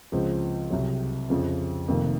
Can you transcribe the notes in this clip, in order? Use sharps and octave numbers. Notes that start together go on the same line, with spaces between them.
C#2 C#3 F3 C4
C2 C3 F#3
F2 C#3 F3 C4
F1 F2 C3 D#3 A#3